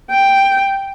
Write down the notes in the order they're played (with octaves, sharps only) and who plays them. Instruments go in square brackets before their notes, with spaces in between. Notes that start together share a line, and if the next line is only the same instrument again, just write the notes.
[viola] G5